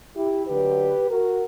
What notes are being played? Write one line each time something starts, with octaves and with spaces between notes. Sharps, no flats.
E4 G4
D2 D3 F#3 G4 B4
F#4 A#4